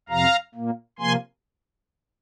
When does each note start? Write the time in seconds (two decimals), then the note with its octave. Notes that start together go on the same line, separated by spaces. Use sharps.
0.09 F2 C3 F3 F5 A#5
0.55 A#2 A#3
0.99 C3 F3 A#3 G#5 C6